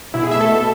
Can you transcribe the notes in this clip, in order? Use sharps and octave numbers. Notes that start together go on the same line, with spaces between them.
B2 E4
G#4
A3 E5
A4
B2